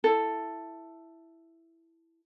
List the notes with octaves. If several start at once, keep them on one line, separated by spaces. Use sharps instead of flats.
E4 A4